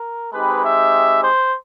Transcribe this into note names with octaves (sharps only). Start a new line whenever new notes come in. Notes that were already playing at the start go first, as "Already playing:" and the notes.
Already playing: A#4
G#3 C4 D#4 G4 B4
E5
C5